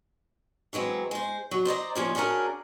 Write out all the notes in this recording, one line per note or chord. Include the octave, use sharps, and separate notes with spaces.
E3 F#3 G#3 C4
G#3 C5
F#3
C5 D5 D#5 A#5
D#2 F3 C#4
C#4 D4 F#4 G#4 A#4